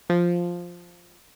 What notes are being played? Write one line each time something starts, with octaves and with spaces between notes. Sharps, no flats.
F3